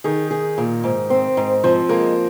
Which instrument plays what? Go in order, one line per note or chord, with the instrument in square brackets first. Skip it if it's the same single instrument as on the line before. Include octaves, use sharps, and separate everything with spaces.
[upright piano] D#3 D#4 [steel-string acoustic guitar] G#4
[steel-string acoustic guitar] G#4
A#2
G#2
C4
G#2
[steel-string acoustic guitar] F3 [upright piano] C4 C5
[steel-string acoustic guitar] G#3 [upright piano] A#3 A#4